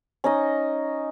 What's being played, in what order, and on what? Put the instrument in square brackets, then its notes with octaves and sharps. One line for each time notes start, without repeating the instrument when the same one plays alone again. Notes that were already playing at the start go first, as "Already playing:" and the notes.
[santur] C#4 D#4 D#5